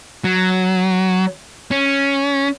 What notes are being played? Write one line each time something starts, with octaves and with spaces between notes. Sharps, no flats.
F#3
C#4